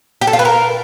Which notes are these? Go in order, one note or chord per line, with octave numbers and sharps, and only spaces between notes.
G4
A4
F4
B4
A#4